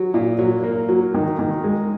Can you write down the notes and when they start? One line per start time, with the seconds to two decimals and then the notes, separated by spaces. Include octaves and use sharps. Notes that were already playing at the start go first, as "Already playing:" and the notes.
Already playing: F#3
0.14 A#2
0.39 F#3
0.63 A#3
0.88 F#3
1.14 D#3
1.39 D#3
1.64 G#3